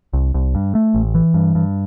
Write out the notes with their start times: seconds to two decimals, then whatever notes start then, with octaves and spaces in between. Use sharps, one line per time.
0.13 C2
0.34 C2
0.55 G2
0.75 A3
0.95 A1
1.15 E3
1.34 G2
1.55 G2